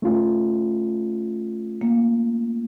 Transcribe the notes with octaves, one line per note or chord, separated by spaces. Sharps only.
A3 C#4 F4
A#3